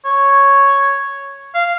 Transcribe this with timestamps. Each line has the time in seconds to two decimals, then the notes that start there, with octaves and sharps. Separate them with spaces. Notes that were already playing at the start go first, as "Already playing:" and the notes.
0.05 C#5
1.54 F5